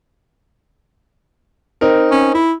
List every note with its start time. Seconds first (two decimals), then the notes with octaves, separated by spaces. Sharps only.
1.81 C4 D#4 A#4
2.11 C#4
2.34 E4